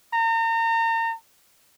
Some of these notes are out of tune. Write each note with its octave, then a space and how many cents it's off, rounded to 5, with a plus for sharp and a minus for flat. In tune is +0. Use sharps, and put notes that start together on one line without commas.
A#5 -35